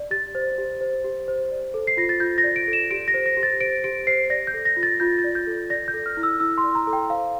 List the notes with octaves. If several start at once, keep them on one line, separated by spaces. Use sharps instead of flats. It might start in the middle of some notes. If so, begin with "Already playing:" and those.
Already playing: D5
G4 A6
C5
G4
C5
G4
C5
D5
A4
C7
F4 A#6
A6
F4 G6
A#6
D5
D7
A4
E7
G4 D7
A#6
C5
A#6
G4
A6
C5 D7
G4 D7
C5 C7
D5 A#6
G6
A4
A#6
F4
A6
F4 G6
A6
D5
G6
A4
D5 A#6
G6
A4
F6
E4
E6
E4 E6
C6
D5
A#5
A4
G5
C5 F5